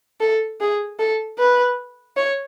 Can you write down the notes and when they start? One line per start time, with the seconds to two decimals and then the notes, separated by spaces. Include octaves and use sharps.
0.20 A4
0.61 G#4
0.99 A4
1.39 B4
2.16 C#5